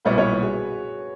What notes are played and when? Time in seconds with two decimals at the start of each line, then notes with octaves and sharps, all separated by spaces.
0.05 B1 A#2 G3 B3 E4 B4 C#5
0.17 B4 C#5
0.42 F#4 G#4